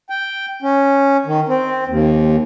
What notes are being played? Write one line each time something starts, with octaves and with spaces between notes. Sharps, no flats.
G5
C#4
D#3
C4
D#2